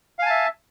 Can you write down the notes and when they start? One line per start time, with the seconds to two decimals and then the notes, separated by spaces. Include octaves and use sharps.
0.19 F5
0.22 G#5
0.26 A5
0.30 E5